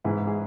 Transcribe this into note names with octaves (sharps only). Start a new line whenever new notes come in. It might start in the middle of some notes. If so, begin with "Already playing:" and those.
G#2 E3 E4 G#4
G#4